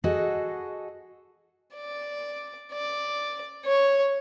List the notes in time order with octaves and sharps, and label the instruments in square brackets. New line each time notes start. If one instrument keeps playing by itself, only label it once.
[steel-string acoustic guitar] F#4 G#4 A4 D#5 F#5
[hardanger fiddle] D5
D5
C#5